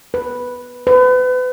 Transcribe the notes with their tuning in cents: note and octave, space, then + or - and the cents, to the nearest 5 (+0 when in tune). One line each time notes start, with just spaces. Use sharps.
B4 -5
B4 +35